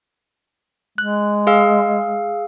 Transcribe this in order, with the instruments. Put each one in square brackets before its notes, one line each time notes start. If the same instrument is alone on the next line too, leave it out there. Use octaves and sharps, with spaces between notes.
[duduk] G#3 [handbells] F#6
[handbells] G#4 F5 E6